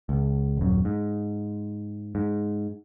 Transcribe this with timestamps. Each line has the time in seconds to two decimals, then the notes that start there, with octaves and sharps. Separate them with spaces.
0.09 C#2
0.57 D#1 F#2
0.85 G#2
2.15 G#2